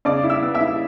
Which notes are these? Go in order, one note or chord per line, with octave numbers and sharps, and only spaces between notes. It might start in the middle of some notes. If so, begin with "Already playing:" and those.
C#3 D5 D6
E4
E5 E6
B3
E5 E6
E4